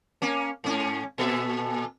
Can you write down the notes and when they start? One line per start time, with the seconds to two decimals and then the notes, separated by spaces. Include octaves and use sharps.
0.22 A#3 C#4
0.64 G#2 C#4
1.18 A#2 A4 E5